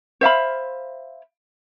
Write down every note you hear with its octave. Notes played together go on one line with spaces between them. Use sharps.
C5 E5 F5 B5